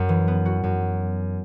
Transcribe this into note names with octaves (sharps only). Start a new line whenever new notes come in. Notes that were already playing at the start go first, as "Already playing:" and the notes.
Already playing: F#2 F#4
E3
B3
F#4
F#2